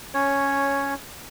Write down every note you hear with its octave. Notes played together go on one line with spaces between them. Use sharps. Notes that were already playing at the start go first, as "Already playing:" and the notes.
C#4 C#5